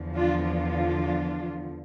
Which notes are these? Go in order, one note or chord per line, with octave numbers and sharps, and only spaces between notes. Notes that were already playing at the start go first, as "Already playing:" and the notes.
Already playing: E2 D3 F3
D4 F4
D4 F4